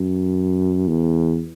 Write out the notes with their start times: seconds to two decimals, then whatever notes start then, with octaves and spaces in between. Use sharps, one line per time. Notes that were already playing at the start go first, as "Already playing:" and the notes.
Already playing: F#2
0.88 E2